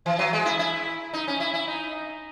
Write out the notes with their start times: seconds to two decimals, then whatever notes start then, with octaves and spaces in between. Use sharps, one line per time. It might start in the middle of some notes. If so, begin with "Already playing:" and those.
0.06 E3
0.19 F#3
0.33 G#3
0.46 E4
0.59 E4
1.14 D#4
1.28 C#4
1.40 E4
1.54 E4
1.68 D#4